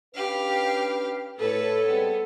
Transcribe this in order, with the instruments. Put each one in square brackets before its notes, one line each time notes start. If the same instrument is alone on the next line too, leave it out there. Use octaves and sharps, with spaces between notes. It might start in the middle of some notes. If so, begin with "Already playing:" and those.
[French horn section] C#4 D4 B4 [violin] G4 F5
[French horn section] A2 [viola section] A4 [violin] B4 C#5
[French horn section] G3 G#3 C4 [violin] B3